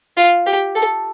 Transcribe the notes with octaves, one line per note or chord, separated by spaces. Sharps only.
F4
G4
A4